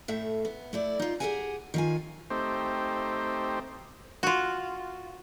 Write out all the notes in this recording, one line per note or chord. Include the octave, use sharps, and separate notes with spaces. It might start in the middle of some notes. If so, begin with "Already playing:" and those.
A2 A3 E5
B3
A3 E4 D5
D#4 F4
G4 G#4 A#4 B4 F#5 G#5
D#3 F4 G#5
A3 C4 D#4 G4 C5
F4 F#4